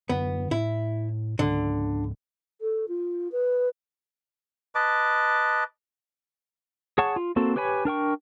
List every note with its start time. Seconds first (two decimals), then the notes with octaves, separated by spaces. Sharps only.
0.09 F#2 D3 B3
0.51 A2 E4
1.39 C#2 G#2 D3
2.61 A4
2.88 F4
3.32 B4
4.75 B4 D#5 A5 D6
6.98 G#4 C#5 F#5 A5 C#6
7.16 F4
7.36 A#3 C4 F#4 A4
7.56 G4 B4 C#5 G#5 B5
7.85 D4 A#4 G5 C#6